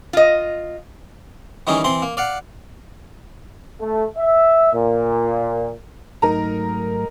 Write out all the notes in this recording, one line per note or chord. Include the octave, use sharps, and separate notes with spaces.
F4 D#5
D#3 E3 G3 C#4 D#4 G#4
E3 C4 C6
A#3
D5 F5 F#5
A3
E5
A#2
G#2 F#3 A3 D#4 A#4 A#5